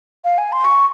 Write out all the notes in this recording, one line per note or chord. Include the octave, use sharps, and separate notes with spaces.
F5
G#5
C6
C#6